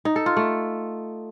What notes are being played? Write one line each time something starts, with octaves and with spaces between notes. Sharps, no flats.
D#4
A4
F4
A3